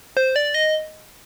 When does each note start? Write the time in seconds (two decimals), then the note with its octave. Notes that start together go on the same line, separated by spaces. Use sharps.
0.17 C5
0.36 D5
0.54 D#5